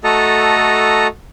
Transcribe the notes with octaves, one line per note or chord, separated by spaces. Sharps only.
A3 F#4 A4 D#5 A5 A#5